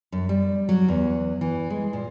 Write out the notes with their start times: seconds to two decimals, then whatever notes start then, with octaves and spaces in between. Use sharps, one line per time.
0.12 F#2
0.29 G3
0.69 F#3
0.88 E2
1.41 E3
1.70 G#3
1.93 A#2